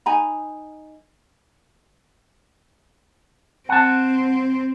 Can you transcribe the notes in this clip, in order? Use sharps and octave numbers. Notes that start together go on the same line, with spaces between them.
D#4 G#5 A#5 B5
C4 F#5 A5